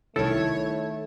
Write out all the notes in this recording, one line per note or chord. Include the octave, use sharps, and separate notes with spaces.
C2 D#3 A3 E4 A4 C#5